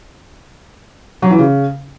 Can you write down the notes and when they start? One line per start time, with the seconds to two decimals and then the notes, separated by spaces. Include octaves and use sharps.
1.22 F#3
1.31 E3
1.39 C#3